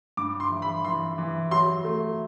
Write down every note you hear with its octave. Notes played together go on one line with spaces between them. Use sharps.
G2 D6
C6
E3
B5
E3 C6
E3
F#3 C6
A3